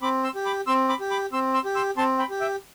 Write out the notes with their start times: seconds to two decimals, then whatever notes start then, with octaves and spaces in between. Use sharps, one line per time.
0.02 C4 B5 D6
0.24 C6 E6
0.35 G4
0.46 B5 D6
0.67 C4 C6 E6
0.89 B5 D6
1.00 G4
1.11 B5 D6
1.33 C4 C6 E6
1.54 C6 E6
1.65 G4
1.75 C6 E6
1.97 C4 A5 C6
2.19 G5 B5
2.30 G4
2.40 E5 G5